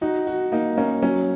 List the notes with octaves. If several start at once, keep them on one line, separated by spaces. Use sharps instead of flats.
D#4 F#4
F#4
A#3 D#4
A#3 C#4
F#3 C#4